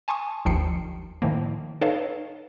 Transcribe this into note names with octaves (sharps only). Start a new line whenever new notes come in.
G#5 A5 C6 C#6 D#6
G1 D#2 F3 G5 C7 C#7
A2 D#3 F3 A#3
D#4 A4 B4 C#5 D#5 F5